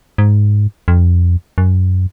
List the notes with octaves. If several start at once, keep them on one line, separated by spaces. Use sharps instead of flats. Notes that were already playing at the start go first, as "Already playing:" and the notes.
G#2
F2
F#2